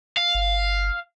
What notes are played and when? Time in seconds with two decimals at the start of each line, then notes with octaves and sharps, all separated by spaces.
0.17 F5
0.35 G1